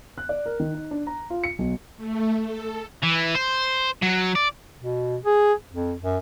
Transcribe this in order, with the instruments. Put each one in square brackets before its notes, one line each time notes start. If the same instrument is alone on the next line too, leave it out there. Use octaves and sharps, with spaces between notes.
[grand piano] F#6
D5
A#4
D#3
D#4
D4
A#5
F4
C#7
B1
[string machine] A3
A4
[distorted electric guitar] E3
C5
F#3
D5
[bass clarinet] B2
G#4
F2
F#2